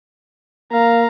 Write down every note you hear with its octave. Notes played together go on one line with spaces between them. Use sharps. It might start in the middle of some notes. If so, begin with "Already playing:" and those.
A#3 F5 A#5